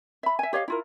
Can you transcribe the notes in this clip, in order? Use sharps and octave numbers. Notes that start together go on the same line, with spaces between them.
E5 B5
E5 G#5
G4 C#5 D#5 F5
E4 F4 A#4